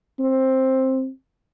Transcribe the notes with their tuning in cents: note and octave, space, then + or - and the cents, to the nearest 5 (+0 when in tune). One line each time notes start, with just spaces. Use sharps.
C4 +10